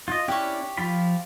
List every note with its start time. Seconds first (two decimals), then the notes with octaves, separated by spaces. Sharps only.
0.08 F4 D#5
0.28 C#4 D4 E4 G4 C#6
0.77 F3 F4 B5